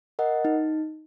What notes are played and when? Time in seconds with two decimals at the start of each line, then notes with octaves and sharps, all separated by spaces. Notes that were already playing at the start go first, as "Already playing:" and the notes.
0.19 A#4 D#5 F#5
0.45 D#4